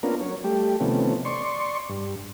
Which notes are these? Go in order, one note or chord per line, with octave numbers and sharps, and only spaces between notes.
A#3 B3 C#4 D4 F4 A#4
F#3 C#5
G3 A3 G4
C3 D#3 F3 A3 B3 C#4
D5 C6 C#6
G2